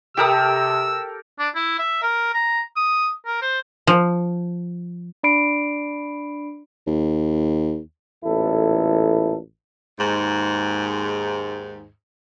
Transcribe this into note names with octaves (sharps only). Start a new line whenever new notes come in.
C3 G4 A4 A#4 G5 A5 D#6 E6
D4
E4
E5
A#4
A#5
D#6
A#4
C5
F3
D4 D5 B5 C7 D7
D#2
A1 E2 A#2 E4 A4
D#2 G#2